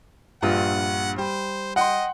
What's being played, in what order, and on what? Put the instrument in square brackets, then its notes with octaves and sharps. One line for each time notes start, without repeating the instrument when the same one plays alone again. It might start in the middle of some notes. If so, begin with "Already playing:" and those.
[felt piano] A#1 G2 F4 [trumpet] F#5
[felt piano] G3 [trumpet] C5
[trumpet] D#5 [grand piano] F#5 G5 C6